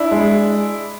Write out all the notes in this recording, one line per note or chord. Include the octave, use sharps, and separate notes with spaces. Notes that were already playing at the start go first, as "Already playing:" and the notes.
Already playing: D4 E4
G#3